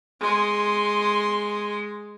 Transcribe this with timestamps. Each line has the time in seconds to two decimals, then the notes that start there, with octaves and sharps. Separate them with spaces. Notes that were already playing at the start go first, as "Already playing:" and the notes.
0.20 G#3 C6